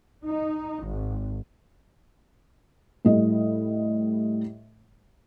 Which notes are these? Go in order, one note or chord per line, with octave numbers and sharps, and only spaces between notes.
D#4
G#1
A2 G3 D#5